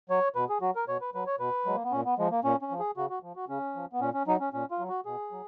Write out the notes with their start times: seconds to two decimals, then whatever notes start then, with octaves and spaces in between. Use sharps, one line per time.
0.09 F#3 C#5
0.35 B2 B4
0.49 G#4
0.61 F#3 F#4
0.75 A#4
0.88 B2 C#5
1.01 B4
1.14 F#3 B4
1.26 C#5
1.40 B2 B4
1.66 F#3 G#3
1.75 A#3
1.84 B3
1.92 A#2 C#4
2.05 B3
2.18 F3 G#3
2.31 A#3
2.44 A#2 C#4
2.62 C#4
2.71 F3
2.79 G#4
2.97 C#3 F#4
3.10 F#4
3.23 F3
3.36 F#4
3.48 C#3 C#4
3.76 F3
3.93 B3
4.01 A#2 C#4
4.14 C#4
4.27 F#3 D#4
4.40 C#4
4.53 A#2 C#4
4.71 F4
4.79 F#3
4.88 F#4
5.05 B2 G#4
5.32 F#3